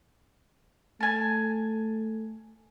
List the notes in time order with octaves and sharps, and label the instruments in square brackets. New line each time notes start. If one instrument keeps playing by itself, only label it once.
[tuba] A3 [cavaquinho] G#5 A5